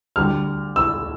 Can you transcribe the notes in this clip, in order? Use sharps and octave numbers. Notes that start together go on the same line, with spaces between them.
D2 D3 G3 D4 G4 F6
E6